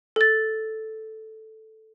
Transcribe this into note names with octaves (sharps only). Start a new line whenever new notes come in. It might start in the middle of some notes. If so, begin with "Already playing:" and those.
A4 A6